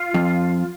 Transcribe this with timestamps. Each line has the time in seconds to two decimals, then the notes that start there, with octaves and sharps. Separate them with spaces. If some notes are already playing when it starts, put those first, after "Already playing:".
Already playing: F4
0.14 F2